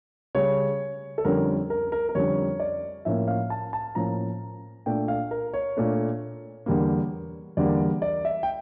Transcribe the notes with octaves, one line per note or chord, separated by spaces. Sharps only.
C#3 G3 C#4 C#5
A4
F2 D3 G3 C#4 A#4
A#4
A#4
A#4
F2 D3 G3 C#4 C#5
D5
A2 F3 A#3 C#4 E5
F5
A5
A5
A2 F3 A#3 C#4 A#5
A#2 A3 D4 G5
F5
A#4
C#5
A#2 A3 D4
E2 D3 G3 A#3
E2 D3 G3 A#3 D5
D5
E5
G5